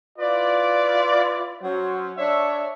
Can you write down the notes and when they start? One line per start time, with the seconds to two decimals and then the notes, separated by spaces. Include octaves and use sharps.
0.18 E4 F4 B4 D5
1.62 F#3 C#4 C5
2.18 D4 C#5 E5